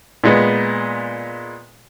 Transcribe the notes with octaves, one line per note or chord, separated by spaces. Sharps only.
A#2 G#3 B3